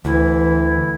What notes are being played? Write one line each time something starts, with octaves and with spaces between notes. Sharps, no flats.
D2 E3 E4